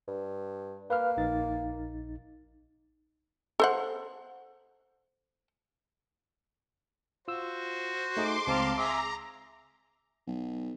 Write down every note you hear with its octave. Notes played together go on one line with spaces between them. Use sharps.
G2
A#3 B4 F5 F6
A#1 D#4 A6
A4 C5 F#5
F4 F#4 C5 E6
A3 D#4 G#4 C6 D6
C#2 C4 C5 F5 A5 A#5
G#4 E5 A#5 D6
B1